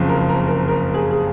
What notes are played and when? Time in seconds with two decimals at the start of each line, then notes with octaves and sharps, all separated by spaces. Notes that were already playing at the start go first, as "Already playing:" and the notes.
Already playing: F#1 F2 C#3
0.09 A#4
0.29 A#4
0.48 A#4
0.68 A#4
0.94 G#4
1.10 G#4